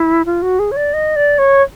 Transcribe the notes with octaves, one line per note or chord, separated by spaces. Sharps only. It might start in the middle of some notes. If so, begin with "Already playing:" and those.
Already playing: E4
F4
F#4
G#4
C#5
D5
D#5
D5
C#5